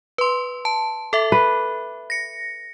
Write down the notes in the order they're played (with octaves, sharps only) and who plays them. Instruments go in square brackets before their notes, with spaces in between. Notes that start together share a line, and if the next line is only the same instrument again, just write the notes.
[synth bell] B4 C6
A5
A4 E5
[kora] B4
[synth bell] A#6 C#7